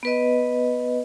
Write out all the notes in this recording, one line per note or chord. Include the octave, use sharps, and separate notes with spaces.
B3 B4 D#5